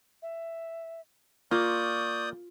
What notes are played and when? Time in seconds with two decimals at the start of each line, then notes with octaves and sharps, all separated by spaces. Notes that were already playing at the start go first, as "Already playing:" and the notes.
0.22 E5
1.51 A#3 F4 D5 C#6 D#6 G6